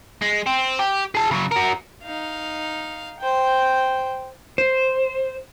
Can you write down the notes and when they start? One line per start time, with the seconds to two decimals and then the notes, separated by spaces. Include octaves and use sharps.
0.22 G#3
0.46 C4
0.79 G4
1.15 G#4 A5
1.31 C#3 F#3
1.52 F#4 A#4
2.03 D#4 F5
3.20 C5 G5
4.58 C5